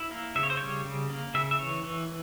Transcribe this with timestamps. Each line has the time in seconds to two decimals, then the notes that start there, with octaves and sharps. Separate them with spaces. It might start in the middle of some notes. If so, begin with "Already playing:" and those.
Already playing: E4
0.11 A#3
0.35 C#3 E5
0.43 C#5
0.50 C5
0.57 G3 C#5
0.85 C#3
1.10 A#3
1.34 C#3 E5
1.51 E5
1.59 E3 C#5
1.83 E3